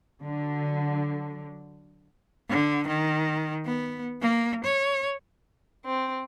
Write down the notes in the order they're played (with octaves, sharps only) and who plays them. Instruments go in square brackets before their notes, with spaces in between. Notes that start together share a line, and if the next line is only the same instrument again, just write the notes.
[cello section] D3 F#3
[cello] D3
D#3
B3
A#3
C#5
[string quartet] C4